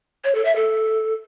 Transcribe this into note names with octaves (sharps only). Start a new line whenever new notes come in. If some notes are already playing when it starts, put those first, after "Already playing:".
C#5
A4
E5
A4